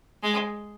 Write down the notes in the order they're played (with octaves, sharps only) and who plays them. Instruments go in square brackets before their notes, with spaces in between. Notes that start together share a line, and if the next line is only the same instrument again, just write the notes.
[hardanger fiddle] G#3